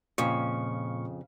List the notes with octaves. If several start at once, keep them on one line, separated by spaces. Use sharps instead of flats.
F2 A#2 C#3 F5 C#6